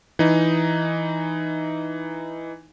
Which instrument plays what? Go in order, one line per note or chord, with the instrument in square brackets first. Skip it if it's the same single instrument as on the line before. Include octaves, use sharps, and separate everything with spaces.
[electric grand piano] E3 D#4